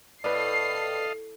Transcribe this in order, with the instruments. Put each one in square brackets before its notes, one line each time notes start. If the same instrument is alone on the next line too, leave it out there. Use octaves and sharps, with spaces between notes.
[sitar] A2 [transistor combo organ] A4 D#5 F5 [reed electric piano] B4 D5 [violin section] C7